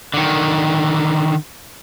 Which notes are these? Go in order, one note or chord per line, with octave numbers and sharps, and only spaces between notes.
D3 D#3